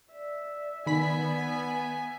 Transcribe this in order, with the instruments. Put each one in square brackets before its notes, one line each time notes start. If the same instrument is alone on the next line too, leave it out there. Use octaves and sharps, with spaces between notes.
[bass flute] D5 [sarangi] E5
[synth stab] D#3 B5 B6 [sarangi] B3 [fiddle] E5 G#5